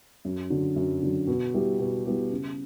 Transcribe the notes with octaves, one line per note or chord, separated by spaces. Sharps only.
F#2
D3 F#3
F#2
D3 F#3
B2
G3 B3 E4 G4
B2
G3 B3 E4 G4
C#3